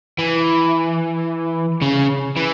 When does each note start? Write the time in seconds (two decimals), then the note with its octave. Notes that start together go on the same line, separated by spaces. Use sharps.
0.18 E3
1.82 C#3
2.37 E3